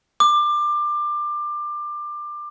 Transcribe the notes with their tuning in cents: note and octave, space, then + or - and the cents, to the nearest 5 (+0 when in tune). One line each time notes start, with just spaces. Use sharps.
D6 +25